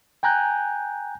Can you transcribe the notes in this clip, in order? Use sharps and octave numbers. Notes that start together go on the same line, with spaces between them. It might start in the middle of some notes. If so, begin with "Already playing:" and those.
G5 G#5 A#5 F#6 G6